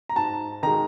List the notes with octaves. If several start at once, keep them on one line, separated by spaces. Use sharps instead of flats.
A#5
G#2 A5
D#3 G#3 A#5